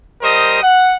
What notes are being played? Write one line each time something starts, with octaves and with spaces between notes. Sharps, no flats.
G3 A#4 C5 D#5 D#6
F#5